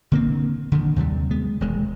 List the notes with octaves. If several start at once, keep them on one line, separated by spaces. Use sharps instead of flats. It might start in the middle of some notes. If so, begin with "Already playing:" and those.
D3 A#3 C4
D3 D#3
D#2 C3 F#3 G3
G#3 B3
E1 D#2 G#3